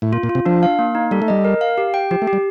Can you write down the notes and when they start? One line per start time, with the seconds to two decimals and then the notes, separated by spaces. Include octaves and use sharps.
0.02 A2
0.13 A#2 F4
0.23 A#2
0.29 F4
0.35 C3
0.45 F3 D4
0.63 F5
0.79 A#3
0.95 D#4
1.11 G3 A4
1.22 A3
1.28 G3 D#5
1.45 A#4
1.61 F5
1.78 G4
1.94 G5
2.11 F3 G4
2.22 A3
2.27 G4
2.33 G3